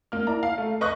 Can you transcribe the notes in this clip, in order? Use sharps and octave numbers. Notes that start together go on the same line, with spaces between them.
A#3 F6
E4 D5 A#5
F5
A3
B4 D#5 C#6 D#6 F#6